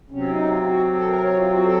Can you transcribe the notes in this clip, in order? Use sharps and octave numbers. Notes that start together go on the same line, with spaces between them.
C3 F#3 C4 C#4
D#4
F4
F4
F#4
A4
A#4
C#5
F4
F#4
A4